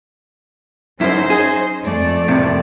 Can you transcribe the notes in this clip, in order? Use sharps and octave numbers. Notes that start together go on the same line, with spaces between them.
F#2 C#4 D#4 E4 C5
G#4
F2 A3 D5
A2 C3